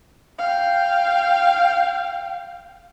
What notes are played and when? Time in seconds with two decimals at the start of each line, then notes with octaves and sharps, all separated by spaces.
0.38 F5 G5